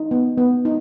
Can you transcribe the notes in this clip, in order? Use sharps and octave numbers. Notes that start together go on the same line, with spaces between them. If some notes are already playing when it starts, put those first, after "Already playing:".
Already playing: D#4
B3
B3
D#4